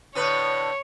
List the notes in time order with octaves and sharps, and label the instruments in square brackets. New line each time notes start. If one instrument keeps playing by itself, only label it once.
[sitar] A2 D3 B4 [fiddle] C#5